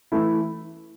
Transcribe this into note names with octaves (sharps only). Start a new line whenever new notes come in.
E3 A3 E4